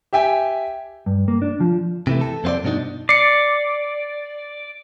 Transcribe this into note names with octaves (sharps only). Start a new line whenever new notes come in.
G4 E5 G5 G#5
G2
A#3
D4
F3
C3 E3 A3
A4
F2 C4 C#4 F4 C5 D5
G2 B2 D4 D#4
D5 C7 C#7